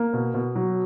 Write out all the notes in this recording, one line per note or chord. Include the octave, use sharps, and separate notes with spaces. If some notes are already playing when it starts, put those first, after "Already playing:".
Already playing: A#3
B2
B2
F#3